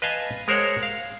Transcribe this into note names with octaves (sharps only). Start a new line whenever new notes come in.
B4 D#5 F5 G#5 A5
G#3 A#4 C5 C#5 F#5
F5